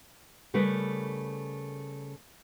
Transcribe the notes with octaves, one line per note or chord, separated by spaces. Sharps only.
C#3 G3 A3 A#4 B4